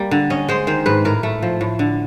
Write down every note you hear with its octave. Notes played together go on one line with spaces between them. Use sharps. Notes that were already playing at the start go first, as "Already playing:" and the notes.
Already playing: G3 A#3
D3
C#4 D#5
G#3 C5
D#3 C5
G#2 B4
A2 A#4
A3
F3
A2
D3